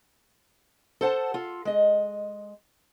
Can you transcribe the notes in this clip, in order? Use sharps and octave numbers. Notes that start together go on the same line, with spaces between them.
A4 C5 F#5 A5
F4 A4
G#3 D#5